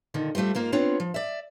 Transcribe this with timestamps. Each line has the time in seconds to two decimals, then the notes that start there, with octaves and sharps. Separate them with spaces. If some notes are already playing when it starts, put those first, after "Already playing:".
0.14 A#2 D3 D#3
0.35 G3 A3 A#3 C4 F4
0.55 G#2 A#3 F4 C5
0.72 B3 C4 D4 F4 C#5
1.00 F3
1.14 D5 E5